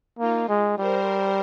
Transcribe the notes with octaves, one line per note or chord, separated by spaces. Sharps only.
A#3 D#4 F4
G#3
G3 A#4 C5